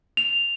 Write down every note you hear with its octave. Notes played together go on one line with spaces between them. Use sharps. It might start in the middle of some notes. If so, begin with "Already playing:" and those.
F7